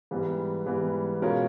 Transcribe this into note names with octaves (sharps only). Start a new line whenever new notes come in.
G#2 E3 G3 B3
G#2 E3 G3 B3
B2 G#3 C#4 F4 A#4